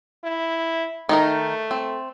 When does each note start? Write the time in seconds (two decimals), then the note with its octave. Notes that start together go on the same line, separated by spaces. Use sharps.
0.24 E4
1.09 D#3 A3 D#4 A#4
1.71 C4